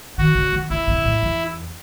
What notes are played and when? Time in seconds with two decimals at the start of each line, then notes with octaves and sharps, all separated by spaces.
0.18 D#3 F#4
0.35 C#3
0.52 D#3
0.70 C#3 E4
0.87 C3
1.05 A2
1.22 E2